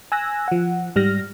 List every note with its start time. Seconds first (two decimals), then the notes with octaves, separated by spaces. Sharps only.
0.12 G#5 E6 F#6 A#6
0.48 F3 F#5
0.96 G#2 G3 F6 A#6